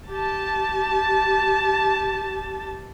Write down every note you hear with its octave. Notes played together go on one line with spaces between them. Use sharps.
G4 A5